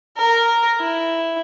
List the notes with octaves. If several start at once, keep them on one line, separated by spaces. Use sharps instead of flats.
A#4
E4